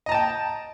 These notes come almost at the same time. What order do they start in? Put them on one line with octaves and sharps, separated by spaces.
D#5 A#5 A5 G5